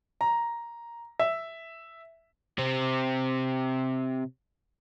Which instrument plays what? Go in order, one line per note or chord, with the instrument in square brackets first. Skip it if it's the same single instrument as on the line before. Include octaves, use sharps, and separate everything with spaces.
[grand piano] A#5
E5
[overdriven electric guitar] C3 C4